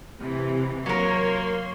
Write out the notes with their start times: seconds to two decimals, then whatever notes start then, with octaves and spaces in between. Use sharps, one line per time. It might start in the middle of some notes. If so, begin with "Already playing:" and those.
0.18 C3 E3
0.86 F#3 A#3 A#4 C#5 C6